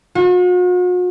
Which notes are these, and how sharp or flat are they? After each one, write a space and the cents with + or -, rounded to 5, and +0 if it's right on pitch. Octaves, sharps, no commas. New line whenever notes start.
F#4 -45